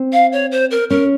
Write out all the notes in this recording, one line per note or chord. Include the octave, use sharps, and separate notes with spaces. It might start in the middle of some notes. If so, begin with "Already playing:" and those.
Already playing: C4
F5
C#5
C5
A#4
C#4 A#4